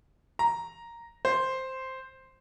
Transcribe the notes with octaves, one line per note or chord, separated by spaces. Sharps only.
A#5
C5